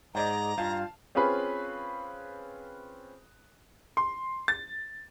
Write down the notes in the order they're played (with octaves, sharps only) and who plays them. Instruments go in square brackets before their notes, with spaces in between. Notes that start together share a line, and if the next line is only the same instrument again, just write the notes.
[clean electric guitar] G#2 [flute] G#4 [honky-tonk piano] C5 D5 D#5 [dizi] A#5
[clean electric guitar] G2 [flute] F4 [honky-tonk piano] F5 A5
[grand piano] C4 C#4 F4 G#4 B4
C6
A6